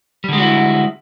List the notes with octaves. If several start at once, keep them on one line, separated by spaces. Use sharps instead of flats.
D3 G3 G#3 E4 F#4